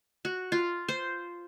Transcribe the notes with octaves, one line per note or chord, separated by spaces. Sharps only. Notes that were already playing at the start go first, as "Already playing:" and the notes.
F#4
F4
C5